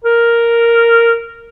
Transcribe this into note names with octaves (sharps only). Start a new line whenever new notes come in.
A#4